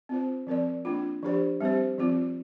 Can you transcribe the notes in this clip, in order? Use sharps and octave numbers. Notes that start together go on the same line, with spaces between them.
C4 F4 C5
F3 C4 A#4 D5
A#3 D4 F4
F3 D4 G4 C5
G3 C4 G4 C5
F3 C4 F4